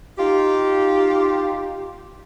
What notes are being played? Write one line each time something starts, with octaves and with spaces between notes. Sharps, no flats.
D#4 F4 G4